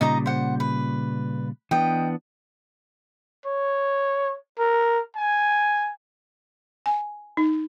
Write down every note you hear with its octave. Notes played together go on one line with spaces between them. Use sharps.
A#2 C#3 G3 D#4 D#5 A#5
C5 F#5
B4
E3 B3 D4 D#5 G5
C#5
A#4
G#5
G#5
D#4